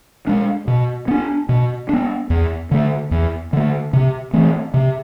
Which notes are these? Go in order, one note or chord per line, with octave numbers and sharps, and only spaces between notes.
G#3 D4
B2
B3 D4
B2
B3 D4
E2
D3 A3
E2
D3 A3
C3
E3 A3 C4
C3